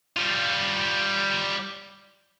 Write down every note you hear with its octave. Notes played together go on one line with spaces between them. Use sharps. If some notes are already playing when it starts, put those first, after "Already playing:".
G3 F4